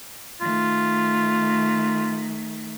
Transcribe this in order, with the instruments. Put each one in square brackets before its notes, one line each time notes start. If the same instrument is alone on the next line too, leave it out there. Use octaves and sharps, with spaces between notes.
[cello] D#3 A3 [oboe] F4